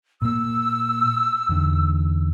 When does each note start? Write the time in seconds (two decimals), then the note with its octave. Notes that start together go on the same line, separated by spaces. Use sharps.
0.22 A#2 A#3 E6
1.49 E2 D3